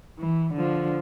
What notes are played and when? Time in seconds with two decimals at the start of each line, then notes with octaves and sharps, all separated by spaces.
0.19 E3
0.54 D3 F3